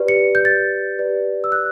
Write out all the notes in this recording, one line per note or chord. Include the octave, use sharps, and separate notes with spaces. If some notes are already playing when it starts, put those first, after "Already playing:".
Already playing: G4 B4 D5
C#7
G6
A6
G4 B4 D5
E6
F#6